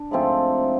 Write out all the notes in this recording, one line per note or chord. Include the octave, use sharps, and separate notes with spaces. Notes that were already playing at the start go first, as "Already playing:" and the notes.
Already playing: D4
G#2 F3 A3 C4